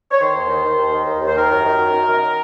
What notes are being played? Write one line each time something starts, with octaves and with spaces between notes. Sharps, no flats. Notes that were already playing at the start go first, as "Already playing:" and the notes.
C#5
D#3 C5
D#2
D#3
D#3
D#2
D#3
D#2
D#2
C5
D#3 A#4
F#2
D#3
F#2
F#2
D#3